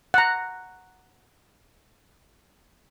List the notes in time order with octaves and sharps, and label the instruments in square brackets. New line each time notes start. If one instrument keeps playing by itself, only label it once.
[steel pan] F#5 A#5